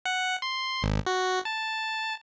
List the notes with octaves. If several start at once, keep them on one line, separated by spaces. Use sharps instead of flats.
F#5
C6
G#1
F#4
A5